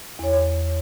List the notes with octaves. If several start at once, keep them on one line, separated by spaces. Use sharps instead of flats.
E2 C#5